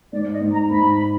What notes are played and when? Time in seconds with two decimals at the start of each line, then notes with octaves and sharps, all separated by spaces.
0.13 G#2 D5
0.31 D#5
0.41 G#2
0.51 A#5
0.70 G#2 B5